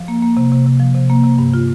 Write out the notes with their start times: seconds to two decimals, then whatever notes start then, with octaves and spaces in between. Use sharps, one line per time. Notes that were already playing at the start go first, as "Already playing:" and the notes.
Already playing: F3
0.08 A#3
0.23 A#3
0.37 C3
0.52 C3
0.66 C3
0.80 F3
0.95 C3
1.10 A#3
1.24 C3
1.38 G2
1.53 F4